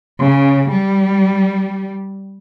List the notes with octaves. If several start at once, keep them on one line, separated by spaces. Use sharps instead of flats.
C#3
G3